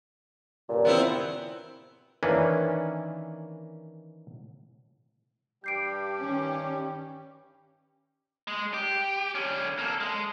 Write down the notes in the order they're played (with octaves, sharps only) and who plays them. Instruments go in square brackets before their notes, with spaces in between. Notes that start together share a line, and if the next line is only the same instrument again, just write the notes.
[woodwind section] G2 A#2 C#3
[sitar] B3 C4 E4
[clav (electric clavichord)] D#3 E3 A#3 C#4 D4 B4
[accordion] G2 G3 G4 [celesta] G6 C7 D7
[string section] D#3 C#4
[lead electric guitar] G#3
G4
D3 C#4
A#3 A4
G#3